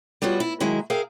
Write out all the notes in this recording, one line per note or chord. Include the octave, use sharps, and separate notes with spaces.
G3 B3 F4 F#4 C#5
E4
D#3 F#3 G#3 E4
G#4 A#4 E5 F5 G5